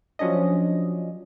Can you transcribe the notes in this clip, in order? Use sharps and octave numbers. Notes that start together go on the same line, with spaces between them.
F3 F#3 C#4 D4 D#5